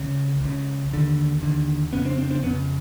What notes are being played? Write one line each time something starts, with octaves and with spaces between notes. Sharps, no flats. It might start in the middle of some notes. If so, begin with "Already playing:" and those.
Already playing: C#2 C#3
C#2 C#3
D#2 D3
D#2 D3
F2 C#3 B3 C#4
C4 D4
C4 D4
C4 D4
F2 C#3 B3 C#4